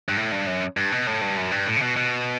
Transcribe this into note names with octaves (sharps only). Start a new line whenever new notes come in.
G2
A2
G2
F#2
G2
B2
A2
G2
F#2
G2
A2
C#3
B2
B2